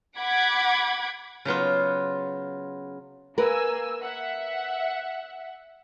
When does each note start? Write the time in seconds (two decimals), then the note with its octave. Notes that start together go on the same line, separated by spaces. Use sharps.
0.18 F#5 B5 D6 G#6
1.45 C#3 F#3 B3 F4
3.38 A#3 A#4 B4 G#5 E6
4.02 E5 F#5